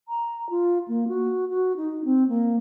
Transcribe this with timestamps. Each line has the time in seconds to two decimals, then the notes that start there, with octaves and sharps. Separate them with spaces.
0.08 A#5
0.50 F4
0.88 A#3
1.08 F#4
1.50 F#4
1.77 D#4
2.05 C4
2.28 A#3